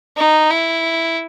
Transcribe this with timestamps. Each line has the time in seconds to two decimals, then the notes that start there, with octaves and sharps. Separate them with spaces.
0.17 D#4
0.51 E4